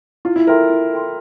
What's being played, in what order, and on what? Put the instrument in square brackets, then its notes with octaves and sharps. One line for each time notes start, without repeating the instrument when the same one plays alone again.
[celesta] E4 [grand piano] F4
[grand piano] E4
[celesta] A4 E5 G5 C6 [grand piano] A#4
[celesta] E4
A4 E5 G5 C6